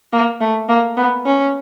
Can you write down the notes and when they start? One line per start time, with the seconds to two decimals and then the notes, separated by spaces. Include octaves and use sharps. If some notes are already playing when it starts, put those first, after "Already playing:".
0.13 A#3
0.41 A3
0.69 A#3
0.97 B3
1.26 C#4